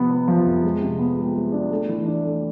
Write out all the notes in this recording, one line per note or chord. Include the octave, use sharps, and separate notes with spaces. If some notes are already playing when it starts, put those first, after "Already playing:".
Already playing: C3 F3 B3
B3
F3
F2
G#3
C3
B3
G#3
G#3
D4
A3
E3
D4
A3